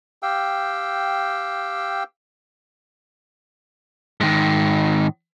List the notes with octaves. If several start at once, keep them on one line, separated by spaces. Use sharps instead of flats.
G4 F5 G5 E6
G#2 D#3